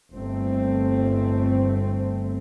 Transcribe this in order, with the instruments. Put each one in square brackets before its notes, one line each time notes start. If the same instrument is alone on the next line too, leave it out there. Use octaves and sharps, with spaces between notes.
[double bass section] G1 A3 C4